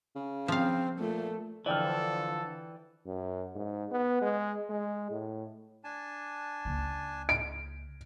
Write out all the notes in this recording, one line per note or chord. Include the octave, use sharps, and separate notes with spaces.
C#3
F3 C4 F5
A#2 A3
D3 E3 F3 A4 D5 G5 F6
F#2
G#2
B3
G#3
G#3
A2
D4 G#5 A5
C#2 A#3
D7